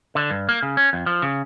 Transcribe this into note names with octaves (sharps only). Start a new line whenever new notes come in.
D3
G2
A#3
C#3
C#4
F2
F3
C#3